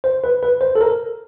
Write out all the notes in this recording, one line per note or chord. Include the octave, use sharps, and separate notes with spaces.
C5
B4
B4
C5
A4
A#4